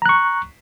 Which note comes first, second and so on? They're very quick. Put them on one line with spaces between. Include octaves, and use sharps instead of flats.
A#5 F#6 C#6